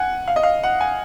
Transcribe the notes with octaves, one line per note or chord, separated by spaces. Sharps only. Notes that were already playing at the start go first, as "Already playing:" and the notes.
Already playing: F#5 G#5
F5
D#5
F5
F#5
G#5